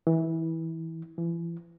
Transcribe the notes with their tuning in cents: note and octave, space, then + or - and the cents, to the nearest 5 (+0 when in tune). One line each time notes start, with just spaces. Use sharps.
E3 -20
E3 +35